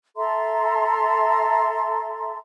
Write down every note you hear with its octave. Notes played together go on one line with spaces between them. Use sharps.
A4 E5 A#5 C6